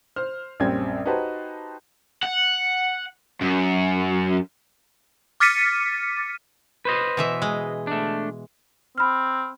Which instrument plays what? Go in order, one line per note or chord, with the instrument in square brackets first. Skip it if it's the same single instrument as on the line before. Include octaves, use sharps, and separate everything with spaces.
[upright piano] C5 F6
A#1 F#2 G3 C4 C#4 G#6
D#4 F#4 G4 B4 C5 A5
[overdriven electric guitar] F#5
F#2
[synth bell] D6 F6 A6 B6 C#7 D#7
[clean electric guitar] B4 C5 D#5
[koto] B2 E3 E5
G#3
[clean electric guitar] A3 D4
[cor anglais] C4 [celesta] B5 F6